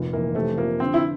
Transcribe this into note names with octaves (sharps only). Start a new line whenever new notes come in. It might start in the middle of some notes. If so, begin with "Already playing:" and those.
Already playing: F1 A#2
E3 A#3
C3 A3
F3 A#3
D3 C4
E4